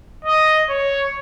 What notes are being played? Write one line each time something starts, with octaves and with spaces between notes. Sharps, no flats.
D#5
C#5